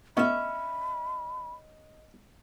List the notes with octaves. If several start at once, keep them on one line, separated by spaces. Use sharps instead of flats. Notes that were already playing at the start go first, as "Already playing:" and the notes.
A2 B3 C#4 F#4 D#5 E5 B5